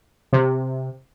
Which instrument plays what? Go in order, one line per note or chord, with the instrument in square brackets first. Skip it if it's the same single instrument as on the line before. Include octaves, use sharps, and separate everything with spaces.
[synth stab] C3